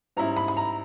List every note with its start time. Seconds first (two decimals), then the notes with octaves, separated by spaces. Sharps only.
0.17 G#2 G3 C#4 E4 A#5
0.37 B5
0.48 B5
0.57 A#5